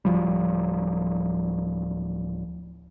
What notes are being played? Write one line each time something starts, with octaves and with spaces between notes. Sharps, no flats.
D1 D#2 F3 G3